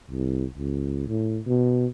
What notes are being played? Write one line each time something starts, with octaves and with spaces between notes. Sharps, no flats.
C2
C#2
A2
B2